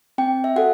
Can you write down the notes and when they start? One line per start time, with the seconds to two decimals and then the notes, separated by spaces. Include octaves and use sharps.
0.18 C4 G5
0.44 E5
0.56 F#4 A4 F#5